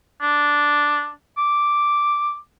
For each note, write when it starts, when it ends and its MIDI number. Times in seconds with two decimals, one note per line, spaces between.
0.21 1.10 62
1.37 2.36 86